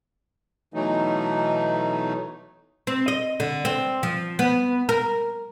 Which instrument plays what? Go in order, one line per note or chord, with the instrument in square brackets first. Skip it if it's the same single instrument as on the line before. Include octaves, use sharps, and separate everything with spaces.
[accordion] B2 E3 F#3 A3 D#4
[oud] C4
D#5
D3
C4
F3
B3
A#4